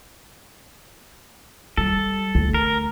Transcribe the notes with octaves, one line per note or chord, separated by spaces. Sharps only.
G3 A4
D2
A#4